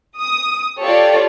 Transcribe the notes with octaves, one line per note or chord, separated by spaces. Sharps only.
D#6
F4 G4 A4 C#5 D5